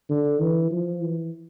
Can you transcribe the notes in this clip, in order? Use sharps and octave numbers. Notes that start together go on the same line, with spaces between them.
D3
E3
F3
E3